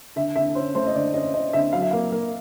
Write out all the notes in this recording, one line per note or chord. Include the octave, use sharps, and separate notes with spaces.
D3 E5
D3 E5
C#4 C5
A3 C5
D#5
D3 D5
C#4 D#5
C#4 D#5
D3 E5
F#3 F5
E5
A#3 F5
A#3